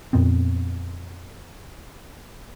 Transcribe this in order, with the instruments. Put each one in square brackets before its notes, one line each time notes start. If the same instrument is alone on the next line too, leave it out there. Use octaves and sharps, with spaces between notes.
[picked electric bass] F2 A#2 B3 C4